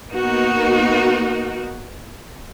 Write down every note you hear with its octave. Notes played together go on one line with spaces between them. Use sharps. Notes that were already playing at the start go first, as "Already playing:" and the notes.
A#3 B3 D#4 F#4 A#4